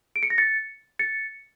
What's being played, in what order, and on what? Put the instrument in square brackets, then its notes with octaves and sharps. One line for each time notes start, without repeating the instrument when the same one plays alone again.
[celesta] D7
C#7
A#6
A6 C#7
A6 C#7